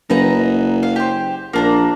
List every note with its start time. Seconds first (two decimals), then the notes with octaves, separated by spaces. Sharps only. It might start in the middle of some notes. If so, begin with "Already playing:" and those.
0.10 F#1 D#4 B4 A#5
0.83 F5
0.96 G4 C5
1.53 A#1 A#3 D4 A#5